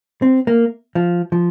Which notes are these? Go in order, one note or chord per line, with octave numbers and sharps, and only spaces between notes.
C4
A#3
F3
F3